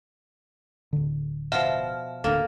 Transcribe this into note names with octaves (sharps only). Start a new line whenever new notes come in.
D1 D3
B2 F3 E5 F6
D1 D2 A#3 D4 A4